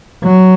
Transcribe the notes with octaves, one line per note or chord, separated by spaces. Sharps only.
F#3